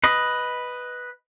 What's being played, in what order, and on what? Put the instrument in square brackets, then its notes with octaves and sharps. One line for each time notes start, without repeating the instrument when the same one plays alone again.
[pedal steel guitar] B4 D#5